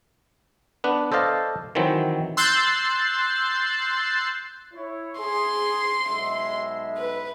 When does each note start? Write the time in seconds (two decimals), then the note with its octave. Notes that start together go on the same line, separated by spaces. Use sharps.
0.84 B3 D4 B4
1.12 A4 C5 D5 D#5 F5 A5
1.75 D#3 E3 F#3 C4
2.37 C6 E6 F#6 G6 A6 C7
4.74 E4 C#5
5.20 G#4 C6
6.07 B1 G#3 E5
6.98 B4